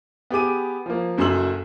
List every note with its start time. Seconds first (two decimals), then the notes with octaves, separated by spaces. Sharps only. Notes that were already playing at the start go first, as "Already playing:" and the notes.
0.31 B3 G4 G#4 D6 D#7
0.86 F3 A#3
1.18 F#1 F#2 A4 C6 E6 F#7